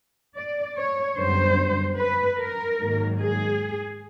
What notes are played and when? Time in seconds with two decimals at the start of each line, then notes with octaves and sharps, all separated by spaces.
0.36 D5
0.76 C#5
1.17 F#2 D3 G3 B3 C5
1.98 B4
2.38 A#4
2.79 G#2 D#3 F#3 A#3
3.20 G#4